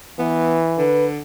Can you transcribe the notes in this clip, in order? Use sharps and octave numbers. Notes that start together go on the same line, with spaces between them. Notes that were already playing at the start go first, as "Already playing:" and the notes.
E3 B3
D3 B4